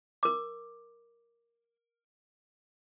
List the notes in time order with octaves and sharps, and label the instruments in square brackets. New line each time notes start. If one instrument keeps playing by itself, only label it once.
[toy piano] A#4 D6